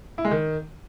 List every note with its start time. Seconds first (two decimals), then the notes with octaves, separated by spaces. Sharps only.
0.18 E4
0.25 G#3
0.31 D#3